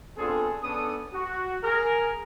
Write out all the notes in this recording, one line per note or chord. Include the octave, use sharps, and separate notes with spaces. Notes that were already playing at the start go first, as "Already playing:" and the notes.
B3 C4 D4 F4 G#4 A4
B3 C#4 D4 A4 D#6
F#4
G#4 A#4